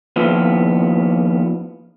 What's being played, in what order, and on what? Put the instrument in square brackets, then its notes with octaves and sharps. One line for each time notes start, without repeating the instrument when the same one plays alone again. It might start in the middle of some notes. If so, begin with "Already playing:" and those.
[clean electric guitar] D#2 F3 B3